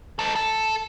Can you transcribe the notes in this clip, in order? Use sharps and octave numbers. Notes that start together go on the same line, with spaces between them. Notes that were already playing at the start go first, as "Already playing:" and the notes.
D#4 A4
A4